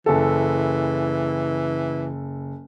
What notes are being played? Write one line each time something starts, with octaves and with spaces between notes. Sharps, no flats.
F#1 E3 A4